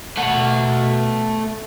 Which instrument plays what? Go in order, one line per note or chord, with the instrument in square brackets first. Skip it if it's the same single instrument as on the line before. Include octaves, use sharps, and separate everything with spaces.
[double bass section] B2 [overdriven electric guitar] A3 F#5